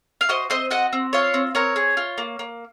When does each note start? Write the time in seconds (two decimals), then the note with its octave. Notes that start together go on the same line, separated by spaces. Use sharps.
0.21 F5
0.29 F#4 C5 D#5
0.50 C4 C5 D#5
0.71 F#4 D#5 F#5
0.93 C4
1.13 F4 C#5 F5
1.34 C4
1.55 C4 A#4 C#5
1.76 G#4
1.97 F4
2.18 A#3
2.39 A#3